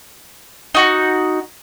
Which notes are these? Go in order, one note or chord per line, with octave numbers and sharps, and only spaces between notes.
D#4 F#4